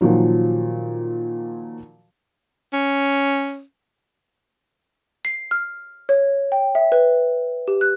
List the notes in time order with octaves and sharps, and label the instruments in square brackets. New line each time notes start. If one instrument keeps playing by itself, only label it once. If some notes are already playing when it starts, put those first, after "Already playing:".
[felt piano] A#2 D#3 F3 F#3
[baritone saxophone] C#4
[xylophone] C7
F6
C#5
G5
E5
B4
G4
F#6